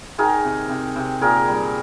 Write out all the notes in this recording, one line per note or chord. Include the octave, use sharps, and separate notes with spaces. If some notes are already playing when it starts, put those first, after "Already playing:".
D#3 G#4 A#4
C3
C3
C3
A#2 G#4 A#4
G3